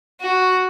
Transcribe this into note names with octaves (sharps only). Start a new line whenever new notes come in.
F#4